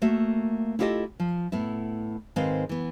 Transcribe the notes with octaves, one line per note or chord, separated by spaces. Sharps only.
A3 A#3 F#4 E5
E4 F4 G4 A4 D5 D#5
F3
A2 B3 E4
G#2 D#3 G#3 C4 B4 F5
E3 B3